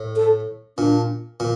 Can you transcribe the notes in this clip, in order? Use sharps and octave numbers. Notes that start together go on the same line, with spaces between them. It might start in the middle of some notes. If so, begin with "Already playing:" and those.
Already playing: A2
A4
A#2 D4
A#2